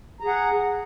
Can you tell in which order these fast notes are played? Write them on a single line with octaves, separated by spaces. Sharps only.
A#5 G#4 F#5